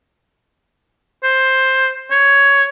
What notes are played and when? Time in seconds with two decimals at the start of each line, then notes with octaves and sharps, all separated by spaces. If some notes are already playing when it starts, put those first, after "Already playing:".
1.24 C5
2.11 C#5